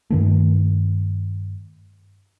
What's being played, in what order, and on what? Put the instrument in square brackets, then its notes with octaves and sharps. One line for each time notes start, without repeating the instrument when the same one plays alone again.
[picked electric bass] G2 D#3 A3